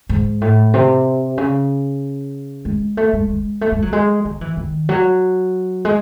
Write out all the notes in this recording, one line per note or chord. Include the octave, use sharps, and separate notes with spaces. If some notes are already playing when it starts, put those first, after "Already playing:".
G#2
A2
C3
C#3
G#3
A3
G#3
G#3
A3
G#3
F#3
G#3
F#3
E3
D#3
F#3
G#3